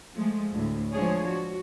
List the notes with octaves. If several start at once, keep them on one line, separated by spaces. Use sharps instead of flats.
F3 G#3 A3
D2 A2
F3 G#3 D4 G#4 C#5
F#4